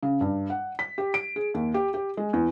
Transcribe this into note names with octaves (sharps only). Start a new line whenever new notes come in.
C#3
G2
F#5
B6
G4
D7
G#4
D#2
G4
G4
G#3
E2